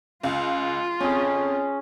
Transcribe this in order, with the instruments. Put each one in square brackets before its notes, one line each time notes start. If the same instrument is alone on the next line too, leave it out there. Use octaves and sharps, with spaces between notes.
[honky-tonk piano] C#2 [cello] F4
[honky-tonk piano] F2 [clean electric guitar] C#4 G#4